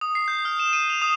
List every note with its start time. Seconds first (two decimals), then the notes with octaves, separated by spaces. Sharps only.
0.01 D#6
0.15 C7
0.28 G6
0.45 F6
0.59 E7
0.73 D#7
0.90 F7
1.02 D#6